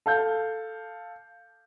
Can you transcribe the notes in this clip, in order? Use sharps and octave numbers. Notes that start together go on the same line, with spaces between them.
A4 F5 G6